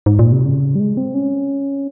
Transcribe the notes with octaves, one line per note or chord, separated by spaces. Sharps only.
G#2
A#2
C3
C#3
G3
G#3
C4
C#4